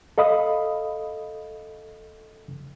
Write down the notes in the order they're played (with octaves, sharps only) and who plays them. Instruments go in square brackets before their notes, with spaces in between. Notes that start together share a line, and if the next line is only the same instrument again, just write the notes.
[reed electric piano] A4 D#5 F5 B5 D#6